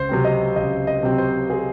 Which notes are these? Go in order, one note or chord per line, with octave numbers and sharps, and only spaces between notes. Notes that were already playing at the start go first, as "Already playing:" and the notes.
Already playing: C#2 C5
C3 F#3 C4
D#5
C#2 D#5
D#5
C3 F#3 C4
C5
G#4